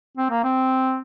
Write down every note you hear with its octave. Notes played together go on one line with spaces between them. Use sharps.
C4
A#3
C4